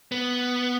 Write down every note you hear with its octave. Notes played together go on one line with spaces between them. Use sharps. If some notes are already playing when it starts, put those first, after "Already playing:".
B3